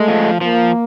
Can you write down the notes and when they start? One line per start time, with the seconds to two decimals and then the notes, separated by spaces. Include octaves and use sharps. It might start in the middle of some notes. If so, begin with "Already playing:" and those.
Already playing: G#3 A3
0.08 F3
0.41 F3 A#3